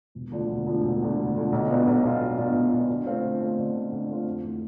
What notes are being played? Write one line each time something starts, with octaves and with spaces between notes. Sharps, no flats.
E1
D2 D3 F3
E1
D2 D3 F3
E1
D2 D3 F3
E1
D2 D3 F3
B1
B2 B3 D4 F4
B1
B2 B3 D4 F4
B1
B2 B3 D4 F4
B1
B2 B3 D4 F4
D3
A3 C4 F4
D3
A3 C4 F4
D3
A3 C4 F4
D3
A3 C4 F4
F2
E3 A3